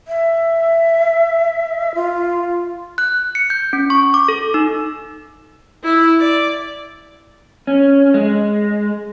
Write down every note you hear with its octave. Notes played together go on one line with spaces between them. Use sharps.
E5
F4
F#6
C#7
G6
C#4
C#6
D6
A4
D#4
E4
D5
C#4
G#3